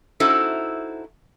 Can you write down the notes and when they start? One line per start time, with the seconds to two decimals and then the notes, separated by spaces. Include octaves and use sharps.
0.20 C#4 D#4 E4 F#4 A4 C5